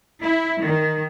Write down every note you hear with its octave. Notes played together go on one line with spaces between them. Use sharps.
E4
D#3